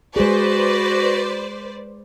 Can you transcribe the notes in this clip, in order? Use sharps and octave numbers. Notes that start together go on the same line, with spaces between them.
G#3 F#4 G#4 B4 C5 D5